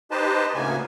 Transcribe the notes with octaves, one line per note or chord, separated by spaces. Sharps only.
D#4 G4 B4 C5 D#5 A5
D2 A2 C#3 A#3 B3 G#5